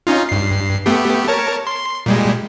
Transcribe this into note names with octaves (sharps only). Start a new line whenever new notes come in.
C#4 D#4 F4
G2 C7
A3 B3 G4
A#4 C#5 A5
C6
A#2 G3 G#3